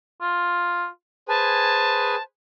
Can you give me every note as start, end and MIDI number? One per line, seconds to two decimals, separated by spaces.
0.21 0.87 65
1.28 2.16 68
1.28 2.16 71
1.28 2.21 72
1.28 2.16 80
1.28 2.22 81